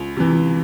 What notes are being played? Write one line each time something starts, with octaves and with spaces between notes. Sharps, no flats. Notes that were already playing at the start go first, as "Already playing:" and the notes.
Already playing: C#2
C3 E3